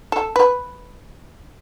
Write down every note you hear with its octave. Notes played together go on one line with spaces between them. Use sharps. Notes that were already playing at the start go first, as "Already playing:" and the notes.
A4
B4